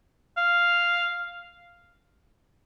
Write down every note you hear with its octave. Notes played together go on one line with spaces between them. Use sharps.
F5